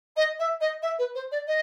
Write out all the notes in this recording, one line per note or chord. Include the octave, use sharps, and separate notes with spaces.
D#5
E5
D#5
E5
B4
C5
D5
D#5